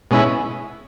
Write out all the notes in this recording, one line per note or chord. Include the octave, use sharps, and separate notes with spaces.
B2 G#3 C#4 E4